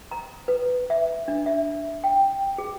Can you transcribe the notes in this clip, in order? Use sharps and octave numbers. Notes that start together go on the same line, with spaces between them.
A#5
B4
E5
D4
E5
G5
G#4